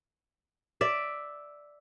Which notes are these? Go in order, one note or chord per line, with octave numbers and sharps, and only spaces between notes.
D5 E5